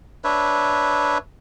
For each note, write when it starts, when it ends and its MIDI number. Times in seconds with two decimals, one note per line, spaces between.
0.24 1.18 62
0.24 1.18 71
0.24 1.18 73
0.24 1.18 76